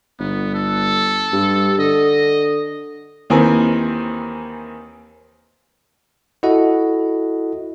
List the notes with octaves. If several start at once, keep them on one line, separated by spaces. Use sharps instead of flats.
G1 B3
A4
G2
D3 D#5
D#2 D#3 E3 C4 C5 G#5
E4 F#4 A4 D#5 F#5